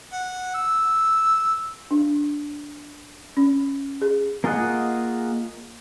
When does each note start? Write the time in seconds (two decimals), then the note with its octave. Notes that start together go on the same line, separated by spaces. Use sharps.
0.13 F#5
0.54 E6
1.91 D4
3.37 C#4
4.01 G#4
4.44 A#3 F4 G#4 D#5 F#5